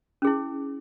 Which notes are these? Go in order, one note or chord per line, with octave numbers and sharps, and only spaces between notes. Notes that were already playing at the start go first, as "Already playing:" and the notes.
C#4 E4 G#4